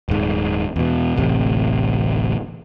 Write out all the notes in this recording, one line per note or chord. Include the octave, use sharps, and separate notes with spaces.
D#1 G#2
E2 B2
D1 A1 C3